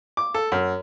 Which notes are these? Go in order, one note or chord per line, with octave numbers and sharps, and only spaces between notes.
D6
A4
F#2